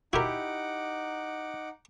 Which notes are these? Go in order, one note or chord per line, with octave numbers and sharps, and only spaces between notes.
D#4 E4 F#4 G4 A#4 F#5 D6